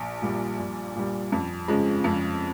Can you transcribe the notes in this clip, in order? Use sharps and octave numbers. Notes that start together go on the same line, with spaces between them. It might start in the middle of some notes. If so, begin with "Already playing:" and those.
Already playing: A#1
A#2 G3
A#1
A#2 G3
F2
C#3 F3 G#3
F2